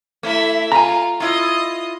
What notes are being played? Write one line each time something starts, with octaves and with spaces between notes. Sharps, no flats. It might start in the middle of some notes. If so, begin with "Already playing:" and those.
A3 E4 E5
F4 G#5 A#5
E4 F4 D#5